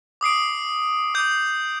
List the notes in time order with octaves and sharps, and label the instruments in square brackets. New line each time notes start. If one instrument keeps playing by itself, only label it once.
[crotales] D6 D#6 C7 D7
D6 D#6 G6